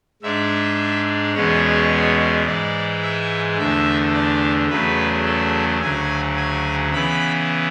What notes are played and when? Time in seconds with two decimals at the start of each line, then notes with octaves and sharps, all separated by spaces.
0.22 G#2 G#3 D4 E5
1.34 E2 B2 G#3 C#4 C#5
2.46 G#2 E3 G#3 D5
3.02 E5
3.58 E2 D3 A3 E5
4.14 D5
4.70 E2 C#3 F#3 A3 B4
5.25 A4
5.82 D2 C#3 F#3 G#5
6.37 G#5
6.93 C#3 E3 B3 B5